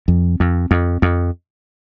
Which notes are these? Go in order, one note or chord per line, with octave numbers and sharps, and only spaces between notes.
F2
F2
F2
F2